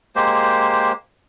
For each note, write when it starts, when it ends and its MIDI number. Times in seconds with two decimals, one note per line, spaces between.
0.16 0.92 56
0.16 0.92 58
0.16 0.92 67
0.16 0.92 72